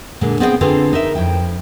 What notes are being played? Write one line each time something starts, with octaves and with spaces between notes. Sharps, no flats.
A#2 D3 G#3
B3 C4 G#4 D#5 F#5 G5
D3 C4 F4 G#4 A4 B4
D#4 A#4 E5
F2 E4 G5